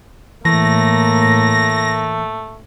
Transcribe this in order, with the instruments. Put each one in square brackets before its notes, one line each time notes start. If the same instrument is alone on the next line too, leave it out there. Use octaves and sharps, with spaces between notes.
[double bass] A2 A#3 [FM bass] E3 [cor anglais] A3 [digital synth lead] A#6